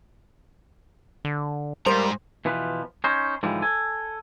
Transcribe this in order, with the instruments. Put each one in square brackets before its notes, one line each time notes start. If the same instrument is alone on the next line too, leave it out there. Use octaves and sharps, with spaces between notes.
[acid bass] D3
[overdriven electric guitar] G#2 A#5 [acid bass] G3 [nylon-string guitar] A#4 F5 [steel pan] C5
[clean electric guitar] B2 E3 F3 B4
C#4 D#4 C5
G#2 D3 E3 F3 G3
A4 G#5